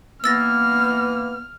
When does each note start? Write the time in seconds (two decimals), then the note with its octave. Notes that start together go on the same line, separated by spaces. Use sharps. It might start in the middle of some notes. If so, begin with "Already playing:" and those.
0.24 E3 A#3 B3 E6 F6 A6 A#6